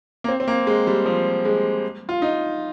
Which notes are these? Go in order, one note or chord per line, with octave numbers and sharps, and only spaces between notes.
A#3
C4
C4
A#3
G#3
G3
F3
G#3
F4
D#4